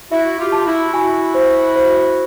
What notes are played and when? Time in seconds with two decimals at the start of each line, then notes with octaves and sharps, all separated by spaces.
0.12 E4 F#4 E5
0.39 F4 G4
0.52 A5
0.66 E4 F#4
0.94 E4 F#4 G#5
1.34 C5
1.76 C5